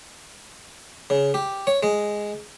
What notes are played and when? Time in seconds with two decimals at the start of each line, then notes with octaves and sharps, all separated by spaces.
1.10 C#3
1.34 G4
1.67 C#5
1.83 G#3